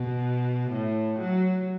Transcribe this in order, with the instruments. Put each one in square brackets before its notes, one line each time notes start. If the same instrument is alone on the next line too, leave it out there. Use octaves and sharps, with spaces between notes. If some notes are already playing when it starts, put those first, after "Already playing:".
Already playing: [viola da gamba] B2
A2
F#3